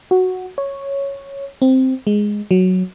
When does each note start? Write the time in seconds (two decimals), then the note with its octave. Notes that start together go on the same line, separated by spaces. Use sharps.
0.11 F#4
0.58 C#5
1.62 C4
2.07 G#3
2.51 F#3